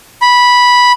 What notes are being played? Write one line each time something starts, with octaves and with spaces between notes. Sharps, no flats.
B5